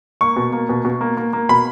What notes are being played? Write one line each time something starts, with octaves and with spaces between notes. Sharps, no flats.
A#3 C#6
B2
A#3
B2
B2
A#3
A#3
A#3
B2 B5